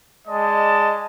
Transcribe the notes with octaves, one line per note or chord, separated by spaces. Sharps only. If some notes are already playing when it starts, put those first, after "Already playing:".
G#3 D5 D#5 A5